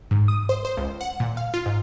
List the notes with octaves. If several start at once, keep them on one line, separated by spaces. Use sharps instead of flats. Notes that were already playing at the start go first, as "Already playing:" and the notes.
G#2
D#6
C5
C5
C#2
F#5
A#2
F5
F4
G#2